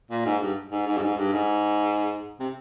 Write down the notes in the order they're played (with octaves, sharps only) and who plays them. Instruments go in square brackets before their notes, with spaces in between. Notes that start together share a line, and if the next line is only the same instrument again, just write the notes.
[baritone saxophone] A#2
G#2
G2
G#2
G#2
G2
G#2
G2
G#2
C3